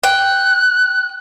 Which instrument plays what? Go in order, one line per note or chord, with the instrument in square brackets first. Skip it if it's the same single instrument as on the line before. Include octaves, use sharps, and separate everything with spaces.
[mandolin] G5 [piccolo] F#6